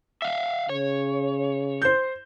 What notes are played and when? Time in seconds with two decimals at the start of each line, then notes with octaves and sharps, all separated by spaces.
0.22 E5 F5
0.69 C#3 C#5
1.82 C5 G6